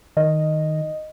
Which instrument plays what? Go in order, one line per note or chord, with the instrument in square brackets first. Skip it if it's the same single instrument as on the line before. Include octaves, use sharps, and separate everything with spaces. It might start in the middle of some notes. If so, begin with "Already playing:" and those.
[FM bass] D#3 [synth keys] D#5